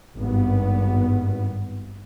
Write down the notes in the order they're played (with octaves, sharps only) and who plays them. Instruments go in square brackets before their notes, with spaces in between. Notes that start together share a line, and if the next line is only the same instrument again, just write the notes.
[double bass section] G#1 G2 B3